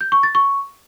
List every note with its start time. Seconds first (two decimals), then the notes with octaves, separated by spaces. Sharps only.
0.01 G6
0.12 C#6
0.23 A6
0.35 C#6